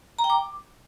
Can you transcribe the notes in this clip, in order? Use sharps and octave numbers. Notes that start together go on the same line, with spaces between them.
A#5
G5
D6